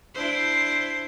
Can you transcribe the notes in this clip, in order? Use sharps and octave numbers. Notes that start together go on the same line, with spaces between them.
D4 E4 C5